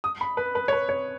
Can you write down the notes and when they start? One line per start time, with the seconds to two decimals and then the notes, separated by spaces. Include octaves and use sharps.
0.04 D#6
0.21 B5
0.37 B4
0.55 B4
0.68 C#5
0.73 B4
0.89 C#5